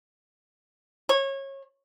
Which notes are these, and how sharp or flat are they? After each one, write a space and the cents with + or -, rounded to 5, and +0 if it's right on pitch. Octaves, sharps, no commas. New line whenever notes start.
C#5 -25